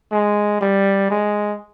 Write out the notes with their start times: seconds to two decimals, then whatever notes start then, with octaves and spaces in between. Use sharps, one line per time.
0.12 G#3
0.61 G3
1.10 G#3